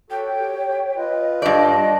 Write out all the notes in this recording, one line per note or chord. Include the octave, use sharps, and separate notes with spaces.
F#4 A4 C#5 G5
G4
F4 B4 D#5
G2 D5 D#5 A5